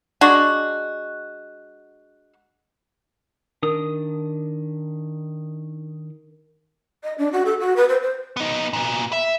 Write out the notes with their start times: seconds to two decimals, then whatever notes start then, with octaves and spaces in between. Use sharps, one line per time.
0.21 G#3 D4 F#4
3.63 D#3 D4 A#4 D#6
7.03 D#5
7.18 D4
7.32 F#4
7.45 A4
7.60 F#4
7.76 B4
7.88 C5
8.02 C5
8.37 B3 D#4
8.73 A#2 B3
9.13 E5